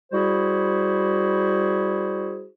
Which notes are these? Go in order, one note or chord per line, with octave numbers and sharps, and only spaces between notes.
G3 E4 F#4 G#4 C5